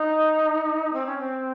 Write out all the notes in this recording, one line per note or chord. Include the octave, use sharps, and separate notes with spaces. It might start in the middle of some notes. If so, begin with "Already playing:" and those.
Already playing: D#4
C4
C#4
C4